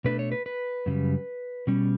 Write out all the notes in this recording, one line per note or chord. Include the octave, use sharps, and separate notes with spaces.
B2 A3 D4 B4
C#5
B4
B4
F#2 C#3 G3
B2 G3 C#4